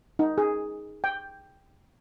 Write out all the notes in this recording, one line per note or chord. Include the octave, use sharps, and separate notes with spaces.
D#4
G#4
G5